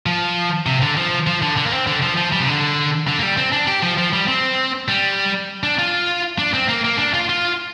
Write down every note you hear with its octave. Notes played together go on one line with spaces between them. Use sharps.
F3
C3
D3
F3
F3
D3
D3
A#3
C4
D3
F3
F3
G3
C3
D3
D3
A#3
G3
C4
D4
G4
F3
F3
G3
C4
G3
D4
F4
D4
C4
A#3
A#3
D4
F4
F4